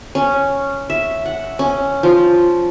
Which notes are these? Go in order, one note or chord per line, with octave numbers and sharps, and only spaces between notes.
C#4
E5
F#5
C#4
F3